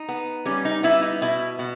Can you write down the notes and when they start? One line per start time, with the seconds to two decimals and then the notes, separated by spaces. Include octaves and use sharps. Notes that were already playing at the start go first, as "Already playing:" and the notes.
Already playing: D#4
0.09 B3
0.45 G3 C#4
0.65 D#4
0.83 B3 E4
1.03 D#4
1.22 B2 E4
1.59 B2